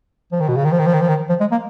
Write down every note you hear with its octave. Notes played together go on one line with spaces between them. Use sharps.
F3
D#3
B2
C#3
D#3
F3
D#3
F3
D#3
F3
D#3
F3
G#3
A#3